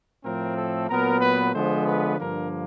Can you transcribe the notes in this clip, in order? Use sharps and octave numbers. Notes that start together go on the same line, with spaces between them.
A2 F3 A3 C4 A#4
A4
A#2 F#3 B3 A#4
B4
D3 F3 G#3 B3 C5
B4
G2 D3 F3 A#3 A#4